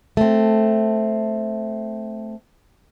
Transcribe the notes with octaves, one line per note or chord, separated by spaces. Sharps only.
A3 C4